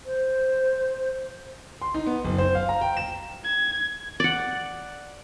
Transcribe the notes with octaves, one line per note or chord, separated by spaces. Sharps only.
C5
C6
D#4
B3
F#1
C5
F5
A#5
G5
E7
G#6
D5 F#5